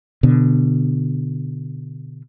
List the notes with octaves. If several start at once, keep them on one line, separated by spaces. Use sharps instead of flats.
B2 D3